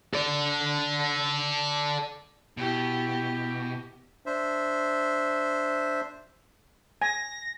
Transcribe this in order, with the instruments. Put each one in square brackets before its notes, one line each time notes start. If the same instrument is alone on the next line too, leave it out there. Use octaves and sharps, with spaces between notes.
[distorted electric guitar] A4 D5
[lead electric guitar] B2 [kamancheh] E4 G4
[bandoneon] D4 C5 E5
[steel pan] G#5 [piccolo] A#6